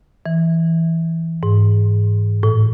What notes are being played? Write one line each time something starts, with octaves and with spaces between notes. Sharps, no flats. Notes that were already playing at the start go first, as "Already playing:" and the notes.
E3
G#2
A2